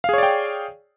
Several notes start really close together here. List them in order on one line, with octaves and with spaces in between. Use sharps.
F5 G#4 C#5 D5 G5